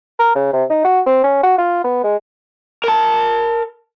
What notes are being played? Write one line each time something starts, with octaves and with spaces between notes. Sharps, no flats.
A#4
C#3
C3
D#4
F#4
C4
C#4
F#4
F4
B3
G#3
A#4 A5